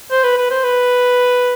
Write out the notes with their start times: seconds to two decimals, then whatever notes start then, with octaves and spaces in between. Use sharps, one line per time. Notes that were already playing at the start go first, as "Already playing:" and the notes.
0.11 C5
0.24 B4
0.37 B4
0.51 C5
0.64 B4